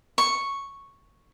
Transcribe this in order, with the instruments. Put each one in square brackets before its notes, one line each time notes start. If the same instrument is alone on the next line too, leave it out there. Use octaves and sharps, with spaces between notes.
[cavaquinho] C#6